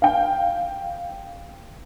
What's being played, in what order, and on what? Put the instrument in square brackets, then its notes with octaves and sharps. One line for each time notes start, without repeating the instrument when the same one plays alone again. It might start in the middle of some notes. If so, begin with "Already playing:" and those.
[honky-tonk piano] F5 G5